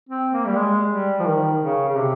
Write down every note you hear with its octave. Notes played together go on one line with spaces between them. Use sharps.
C4
A#3
G3
G#3
G3
F3
D#3
C#3
C#3
C3